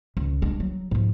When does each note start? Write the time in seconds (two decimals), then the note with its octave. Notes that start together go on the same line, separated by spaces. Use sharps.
0.17 C#2
0.42 G#3 D4
0.60 F#3
0.91 G#2 F3